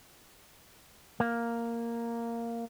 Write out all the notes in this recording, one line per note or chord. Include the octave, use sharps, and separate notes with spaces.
A#3